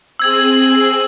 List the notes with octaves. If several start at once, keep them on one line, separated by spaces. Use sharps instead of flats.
C4 G#4 E6 G#6 F#7